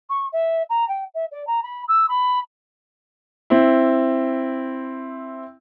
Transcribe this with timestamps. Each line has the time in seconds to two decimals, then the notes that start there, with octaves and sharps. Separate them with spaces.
0.09 C#6
0.32 E5
0.69 A#5
0.88 G5
1.14 E5
1.31 D5
1.46 A#5
1.62 B5
1.88 E6
2.08 B5
3.50 C4 E4